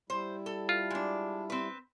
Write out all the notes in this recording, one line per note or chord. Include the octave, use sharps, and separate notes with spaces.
G3 E4 C5
A4
F4
G#3 D4
C4 B4